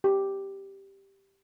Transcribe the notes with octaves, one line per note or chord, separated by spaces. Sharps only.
G4